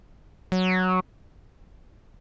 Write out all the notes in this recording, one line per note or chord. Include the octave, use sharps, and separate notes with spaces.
F#3